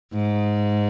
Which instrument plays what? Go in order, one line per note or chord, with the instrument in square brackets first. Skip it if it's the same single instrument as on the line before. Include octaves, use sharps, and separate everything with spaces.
[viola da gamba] G#2